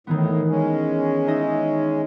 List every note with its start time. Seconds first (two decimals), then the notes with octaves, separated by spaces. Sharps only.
0.07 A2 D#3 E3 B3
0.48 G#3 C#4
1.27 D#4 D#5 E5